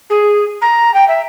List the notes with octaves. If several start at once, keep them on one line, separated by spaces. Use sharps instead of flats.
G#4
A#5
G5
E5